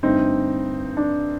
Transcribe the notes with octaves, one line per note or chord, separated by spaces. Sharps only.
G2 D3 A3 C4 D#4
D4